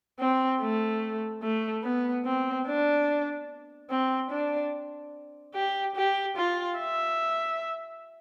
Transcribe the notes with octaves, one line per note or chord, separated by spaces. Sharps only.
C4
A3
A3
B3
C4
D4
C4
D4
G4
G4
F4
E5